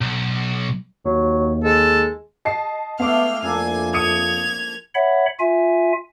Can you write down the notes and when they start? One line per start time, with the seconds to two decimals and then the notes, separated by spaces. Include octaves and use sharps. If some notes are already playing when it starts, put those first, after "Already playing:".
0.01 B1
1.05 D#2 F#3
1.64 G#3 A4
2.45 D#5 A5 C7
3.00 G#3 A3 B3 E4 F5 G5 D6 F6
3.43 F2 A#3 D4 E5 G#5
3.94 F3 D#6 G#6 C#7 D#7 F7
4.95 C#5 E5 F#5 B5
5.39 F4 E5 G#5